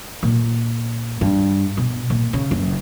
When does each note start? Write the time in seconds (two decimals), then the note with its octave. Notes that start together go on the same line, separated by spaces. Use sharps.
0.23 A#2
1.21 G2
1.77 B2
2.10 A#2
2.33 C#3
2.51 F#1